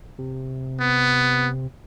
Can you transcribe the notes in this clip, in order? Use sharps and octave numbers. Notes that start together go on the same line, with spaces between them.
C3
B3